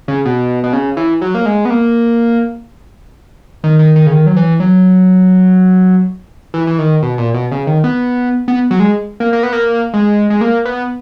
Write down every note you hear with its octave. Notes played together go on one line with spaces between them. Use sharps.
C#3
B2
B2
C#3
E3
F#3
A#3
G#3
B3
A#3
D#3
D#3
D#3
C#3
D#3
F#3
E3
F#3
E3
E3
D#3
B2
A#2
B2
C#3
D#3
B3
B3
F#3
G#3
A#3
A#3
B3
A#3
G#3
G#3
A#3
B3